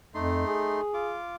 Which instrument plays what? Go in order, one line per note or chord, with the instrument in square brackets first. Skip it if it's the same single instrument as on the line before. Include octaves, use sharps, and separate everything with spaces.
[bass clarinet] F2 [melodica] A3 D#4 C6
[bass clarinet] G#4
[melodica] F4 D6